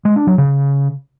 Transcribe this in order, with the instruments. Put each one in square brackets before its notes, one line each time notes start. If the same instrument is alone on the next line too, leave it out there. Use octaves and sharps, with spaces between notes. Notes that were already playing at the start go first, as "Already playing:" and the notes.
[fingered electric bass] G#3
D4
F#3
C#3